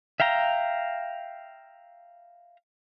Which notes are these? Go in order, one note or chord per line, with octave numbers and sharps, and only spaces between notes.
E5 F5 G5 A#5